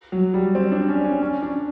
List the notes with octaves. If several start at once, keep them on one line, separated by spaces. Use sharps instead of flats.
F#3
G3
C4
D4
C#4
C#4
C#4
D4